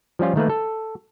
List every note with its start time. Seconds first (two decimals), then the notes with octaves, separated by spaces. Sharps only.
0.19 F3 G3 C#4 F4
0.36 D#3 A3 A#3 B4
0.50 A4